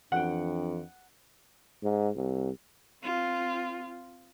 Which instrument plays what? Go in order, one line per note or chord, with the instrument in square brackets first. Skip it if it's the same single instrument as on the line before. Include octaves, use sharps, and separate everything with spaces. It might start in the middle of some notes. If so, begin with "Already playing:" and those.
[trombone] F2 [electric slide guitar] E3 G5 [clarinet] D4 [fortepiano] F#5
[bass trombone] G#2
C2
[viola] C4 F4